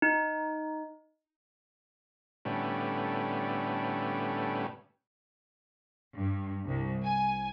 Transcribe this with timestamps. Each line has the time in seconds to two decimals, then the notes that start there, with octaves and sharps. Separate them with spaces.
0.02 D#4
2.45 A2 D3 G3 B3 C#4
6.17 G2
6.67 C2
7.05 G#5